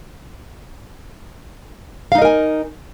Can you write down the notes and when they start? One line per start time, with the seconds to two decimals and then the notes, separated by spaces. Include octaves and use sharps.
2.12 F5
2.15 D#4
2.18 D#5
2.22 A#4
2.25 G#5